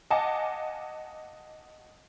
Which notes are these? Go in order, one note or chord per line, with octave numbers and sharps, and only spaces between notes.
D#5 F5 F#5 G#5 A5 D6